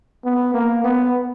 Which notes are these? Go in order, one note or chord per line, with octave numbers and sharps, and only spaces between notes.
B3
A#3
B3